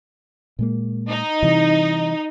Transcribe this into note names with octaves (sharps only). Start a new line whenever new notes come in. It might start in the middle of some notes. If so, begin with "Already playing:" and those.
A#2 G#3 A#3
D#4
C3 E3 G3